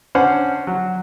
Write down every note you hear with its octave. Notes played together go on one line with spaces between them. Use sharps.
C#4 D4 C5 F#5
F#3